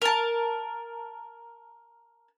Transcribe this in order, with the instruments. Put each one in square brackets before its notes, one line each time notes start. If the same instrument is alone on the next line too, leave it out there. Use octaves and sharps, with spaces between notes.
[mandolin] A#4 A5